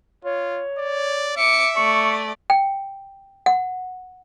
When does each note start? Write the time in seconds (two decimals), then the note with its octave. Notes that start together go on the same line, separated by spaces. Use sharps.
0.25 F4 C#5
0.78 D5
1.37 E5 D6 C#7
1.77 A3 D5 C#6
2.50 G5
3.46 F#5